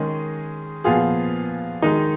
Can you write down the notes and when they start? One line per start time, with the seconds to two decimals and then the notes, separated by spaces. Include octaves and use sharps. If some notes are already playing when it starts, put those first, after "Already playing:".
Already playing: D#3 G#3 C#4 G#4 D#5
0.84 A#2 F3 B3 F4 G#4
1.82 D#3 G#3 D#4